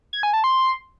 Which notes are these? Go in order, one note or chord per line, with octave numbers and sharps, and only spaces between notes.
G#6
G#5
A5
C6